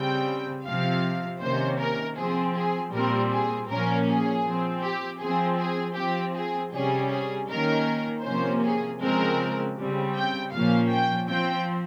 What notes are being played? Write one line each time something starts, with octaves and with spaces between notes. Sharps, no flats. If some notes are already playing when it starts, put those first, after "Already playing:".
Already playing: C#3 G3 C4 G5
C3 F3 C4 F5
C3 D#3 A#3 C#4 C5
A#4
F3 C4 G#4
G#4
A#2 G3 C4 A#4
G#4
A#2 F3 A#3 C#4 A#4
G#4
F3 C4
G4
F3 C4 G#4
G#4
F3 C4 G4
G#4
C3 G3 C#4 G#4
G#4
D#3 A#3 C#4 A#4
C3 F3 A#3 C#4 C5
G#4
C#3 F3 G#3 C4 A#4
C#3 G3 C4
G5
A#2 F3 A#3 C#4 F5
G5
F3 C4 G5